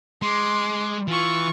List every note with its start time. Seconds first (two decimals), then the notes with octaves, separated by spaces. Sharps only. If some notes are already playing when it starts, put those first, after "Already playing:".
0.22 G#3 C6 D6
1.08 E3 F4 C#6